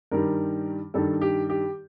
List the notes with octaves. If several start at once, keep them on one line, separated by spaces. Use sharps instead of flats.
G2 D#3 G3 A#4
G2 D#3 G3 A4
G4
G4